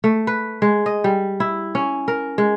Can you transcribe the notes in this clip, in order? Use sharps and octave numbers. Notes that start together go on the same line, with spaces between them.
A3
B4
G#3
D#5
G3
E4
C#4
A#4
G#3